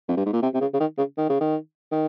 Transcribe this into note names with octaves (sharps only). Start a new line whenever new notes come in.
F2
G2
G#2
A#2
C3
C3
C#3
C#3
D#3
C#3
D#3
C#3
D#3
D#3